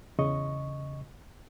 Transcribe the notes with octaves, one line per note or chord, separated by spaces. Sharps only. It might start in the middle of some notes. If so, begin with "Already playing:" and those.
E2 C#3 D#5 C#6